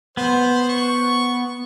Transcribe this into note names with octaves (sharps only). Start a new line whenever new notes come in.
B3 C5
C#6